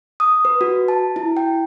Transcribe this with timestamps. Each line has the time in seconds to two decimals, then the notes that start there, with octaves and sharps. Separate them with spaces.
0.20 D#6
0.45 B4
0.61 F#4
0.88 A5
1.16 E4
1.37 G5